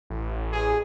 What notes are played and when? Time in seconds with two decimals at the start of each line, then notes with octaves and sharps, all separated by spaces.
0.10 A1
0.51 G#4